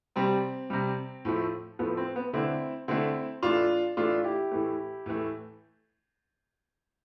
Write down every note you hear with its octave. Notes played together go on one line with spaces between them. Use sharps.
C3 G3 C4
C3 G3
A2 F3 A3
A2 F3 A3 B3
C4
B3
D3 A3 C4 E4
D3 A3 C4 E4
A2 E3 A3 D4 F4
A2 E3 A3 D4 F4
E4 G4
A2 E3 A3
A2 E3 A3